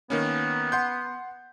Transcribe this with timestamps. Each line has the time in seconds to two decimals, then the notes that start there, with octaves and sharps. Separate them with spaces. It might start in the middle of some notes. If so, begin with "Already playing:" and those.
0.10 D#3 A#3 B3 C#4
0.72 F#5 C6 G6